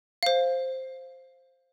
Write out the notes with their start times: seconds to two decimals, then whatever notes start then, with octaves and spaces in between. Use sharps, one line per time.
0.23 C5 F5